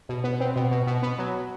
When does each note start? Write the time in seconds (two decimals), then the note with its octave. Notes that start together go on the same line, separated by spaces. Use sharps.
0.09 B2
0.24 B3
0.40 C4
0.56 B2
0.71 B2
0.87 B2
1.03 B3
1.18 F#3